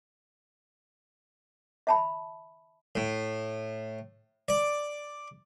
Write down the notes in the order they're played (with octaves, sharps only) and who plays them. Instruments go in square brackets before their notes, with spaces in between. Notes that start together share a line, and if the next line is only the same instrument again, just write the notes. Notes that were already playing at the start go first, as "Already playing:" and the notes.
[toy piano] E5 A5 B5
[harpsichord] A2
D5